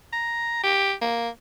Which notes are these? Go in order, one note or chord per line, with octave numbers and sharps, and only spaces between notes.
A#5
G4
A#3